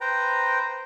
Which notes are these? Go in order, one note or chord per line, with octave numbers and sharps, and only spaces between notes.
B4 C5 G5 A#5